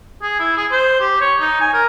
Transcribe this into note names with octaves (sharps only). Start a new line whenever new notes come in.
G#4
E4
G#4
C5
G4
C#5
D#4
G#5
A#4